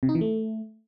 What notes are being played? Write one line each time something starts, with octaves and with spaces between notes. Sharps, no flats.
C3
D#4
E3
A3